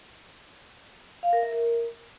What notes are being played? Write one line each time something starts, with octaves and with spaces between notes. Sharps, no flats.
F5
A#4
E5
A#4